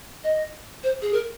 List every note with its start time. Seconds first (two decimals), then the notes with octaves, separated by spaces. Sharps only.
0.24 D#5
0.83 C5
1.02 G#4
1.13 A#4